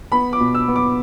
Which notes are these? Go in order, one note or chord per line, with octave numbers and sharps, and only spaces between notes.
B3 B5
D6
B2
E6
B3
D6